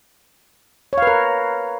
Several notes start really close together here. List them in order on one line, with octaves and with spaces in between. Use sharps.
C#5 F5 B4 A#4